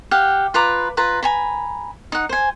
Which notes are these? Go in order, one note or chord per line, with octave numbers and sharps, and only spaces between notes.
G4 F5 F#5
F4 B4 A#5 D6
F4 B4 A#5
G#5 A#5 B5
D#4 F#5
C5 G#5